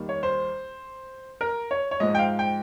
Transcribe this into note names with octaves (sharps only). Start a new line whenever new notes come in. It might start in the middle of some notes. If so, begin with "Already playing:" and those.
Already playing: D#2 D#3 G3
C#5
C5
A#4
C#5
C#5
G#2 F3 G#3 D#5
G5
F5
G5